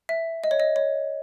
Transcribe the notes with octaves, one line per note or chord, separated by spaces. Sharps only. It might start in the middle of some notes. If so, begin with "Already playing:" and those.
E5
D#5
C#5
D#5
C#5